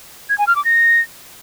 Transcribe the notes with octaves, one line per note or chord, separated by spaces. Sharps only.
G#6
G#5
F6
D6
A#6